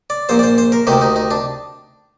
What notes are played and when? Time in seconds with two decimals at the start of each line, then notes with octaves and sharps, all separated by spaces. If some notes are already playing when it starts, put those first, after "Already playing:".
0.10 D5
0.29 A#1 A#2 C5
0.39 D5
0.43 C5
0.58 C5
0.72 A#4
0.87 D2 C3 D#3 G4
1.01 D#4
1.16 D#4
1.31 D4